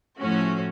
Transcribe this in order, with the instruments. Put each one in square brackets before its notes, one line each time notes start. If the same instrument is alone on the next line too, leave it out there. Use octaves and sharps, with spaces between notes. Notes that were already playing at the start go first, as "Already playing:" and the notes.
[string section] A2 F3 A3 C#4 F#4